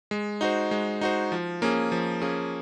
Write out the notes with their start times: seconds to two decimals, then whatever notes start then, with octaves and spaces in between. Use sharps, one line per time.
0.11 G#3
0.41 D#4 F#4 C5
0.71 G#3
1.01 D#4 F#4 C5
1.32 F3
1.62 A#3 C#4 G#4
1.92 F3
2.22 A#3 C#4 G#4